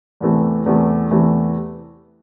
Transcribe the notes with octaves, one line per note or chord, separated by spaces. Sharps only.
E2 C3 E3 A3
E2 C3 E3 A3
E2 C3 E3 A3